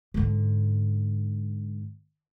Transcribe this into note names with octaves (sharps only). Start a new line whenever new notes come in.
G#2 D3